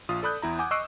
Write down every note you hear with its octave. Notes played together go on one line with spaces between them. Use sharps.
A#1 F4 D#6
A4 D5 B5 D#6 F#6 G6
E2 E4 A#5
F#5 G#5 D6 D#6 G6
D#5 C#6 E6 F#6 C7 D7